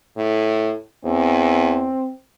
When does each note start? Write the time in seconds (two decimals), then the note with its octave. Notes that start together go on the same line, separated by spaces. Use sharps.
0.17 A2
1.05 E2 C4